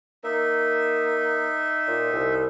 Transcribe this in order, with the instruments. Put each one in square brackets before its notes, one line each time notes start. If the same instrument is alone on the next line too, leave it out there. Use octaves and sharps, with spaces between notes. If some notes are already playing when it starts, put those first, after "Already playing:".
[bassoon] A#3 [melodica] D#4 E5
[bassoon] A#2
C2